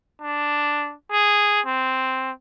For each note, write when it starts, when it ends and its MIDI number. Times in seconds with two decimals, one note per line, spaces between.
0.22 0.94 62
1.11 1.61 68
1.66 2.31 60